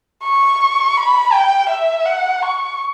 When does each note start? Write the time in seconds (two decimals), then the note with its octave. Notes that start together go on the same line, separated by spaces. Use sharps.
0.24 C#6
0.97 B5
1.32 G5
1.70 E5
2.06 F#5
2.43 C#6